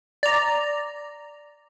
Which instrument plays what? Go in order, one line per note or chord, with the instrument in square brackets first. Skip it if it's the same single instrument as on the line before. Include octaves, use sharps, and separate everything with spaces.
[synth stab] D5 A#5